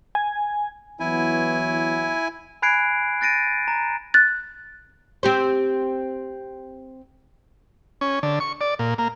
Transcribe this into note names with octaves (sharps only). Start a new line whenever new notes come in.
G#5
E3 F#3 B3 E4 G#5
G#5 B5 F#6 G#6 C7 D7
F#6 A6 A#6 D7 D#7
A#5
F#6 A6
C4 G4 C5
C#4
D3
C#6
D5
A#2
A#3